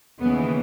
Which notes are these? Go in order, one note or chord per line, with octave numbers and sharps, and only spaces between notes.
D#2 C#3 E3 B3